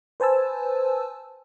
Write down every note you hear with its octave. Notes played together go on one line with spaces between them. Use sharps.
B4 C5 G#5 A5 E6